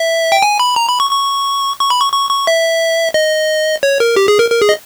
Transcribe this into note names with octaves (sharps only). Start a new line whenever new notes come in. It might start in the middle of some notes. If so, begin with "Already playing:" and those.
Already playing: E5
G5
G#5
B5
A#5
B5
C#6
C#6
C#6
B5
C#6
C#6
C#6
E5
D#5
C#5
A#4
G4
G#4
A#4
A#4
G#4
D#5